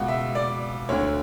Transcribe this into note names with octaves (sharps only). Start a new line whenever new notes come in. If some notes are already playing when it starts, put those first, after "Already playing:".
Already playing: C#2 B2 F#5
E5
D5
D2 D3 C#5